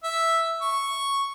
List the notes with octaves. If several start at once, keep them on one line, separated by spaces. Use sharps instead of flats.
E5
C#6